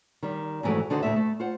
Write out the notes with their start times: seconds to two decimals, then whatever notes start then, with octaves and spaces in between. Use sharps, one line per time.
0.23 D#3 G3
0.63 F2 G#2 E3 F#3 A3
0.90 D3 D#3 D#4 F#4 C5
1.03 D2 A2 A3 E5
1.16 A3
1.40 F4 C5 F#5